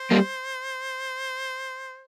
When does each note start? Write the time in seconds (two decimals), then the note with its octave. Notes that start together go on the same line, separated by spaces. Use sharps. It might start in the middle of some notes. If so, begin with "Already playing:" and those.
Already playing: C5
0.11 G3 A#3